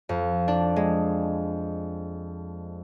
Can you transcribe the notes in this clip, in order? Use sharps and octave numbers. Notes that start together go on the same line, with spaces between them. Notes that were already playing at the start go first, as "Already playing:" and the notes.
F2
D4
G#3